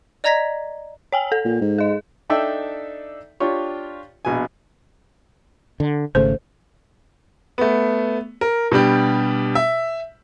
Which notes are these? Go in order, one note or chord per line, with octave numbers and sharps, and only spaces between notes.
D5 D#5 A#5 G#6 A#6 B6
C#5 G5 G#5
A4
A#2
G#2
G#4 D#5
D4 D#4 A4 D5 E5 G5
D4 F4 G4 C#5
A#1 B2 G#5
D3
G#1 C#3 A3 C5
A3 B3
A#4
B2 G3 D4 G4
E5